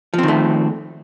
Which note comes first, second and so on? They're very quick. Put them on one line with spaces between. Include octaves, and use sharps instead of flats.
F3 C4 D#3 A3